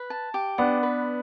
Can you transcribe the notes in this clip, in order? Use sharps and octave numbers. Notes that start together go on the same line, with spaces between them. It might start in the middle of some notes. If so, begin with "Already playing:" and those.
Already playing: B4
A5
G4
B3 D4 F#5
B4